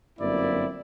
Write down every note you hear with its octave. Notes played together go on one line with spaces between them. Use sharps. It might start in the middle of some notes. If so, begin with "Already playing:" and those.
G1 F#2 A#3 C4 E4 D5